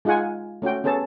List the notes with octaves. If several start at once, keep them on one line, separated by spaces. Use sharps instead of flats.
G#3 D#4 F4 G#4 F#5 G#5
A3 C#4 F#4 G5
B3 C#4 G#4 A4 A5